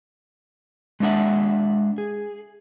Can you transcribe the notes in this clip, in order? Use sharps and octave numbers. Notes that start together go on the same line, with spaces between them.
G#3 A3 D4 E5 F#5
G#4